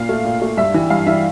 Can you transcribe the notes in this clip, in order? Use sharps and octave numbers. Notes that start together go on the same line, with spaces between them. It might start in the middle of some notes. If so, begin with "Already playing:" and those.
Already playing: A#2 F5
A3
A#2
A3
G2 E5
E3 G3
G2 F5
E3 G3 E5